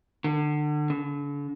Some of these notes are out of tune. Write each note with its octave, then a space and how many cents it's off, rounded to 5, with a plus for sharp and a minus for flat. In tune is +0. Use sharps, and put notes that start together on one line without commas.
D3 +30
D3 -40